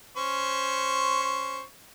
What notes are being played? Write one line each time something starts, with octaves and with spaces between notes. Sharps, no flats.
C#4 C5 C#6